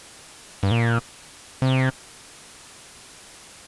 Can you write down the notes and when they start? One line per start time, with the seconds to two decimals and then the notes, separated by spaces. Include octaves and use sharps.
0.63 G2
0.71 A#2
1.62 C3